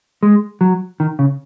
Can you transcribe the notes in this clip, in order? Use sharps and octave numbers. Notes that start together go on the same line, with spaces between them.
G#3
F#3
D#3
C#3